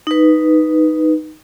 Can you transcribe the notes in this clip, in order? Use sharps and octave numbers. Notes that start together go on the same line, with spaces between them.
D#4 B4